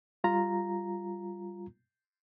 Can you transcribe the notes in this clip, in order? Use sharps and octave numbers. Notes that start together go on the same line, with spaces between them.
G3 F4 A#5